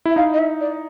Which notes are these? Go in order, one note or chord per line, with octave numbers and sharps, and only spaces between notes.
E4 E5
D#4 F5
D#5
E5
D5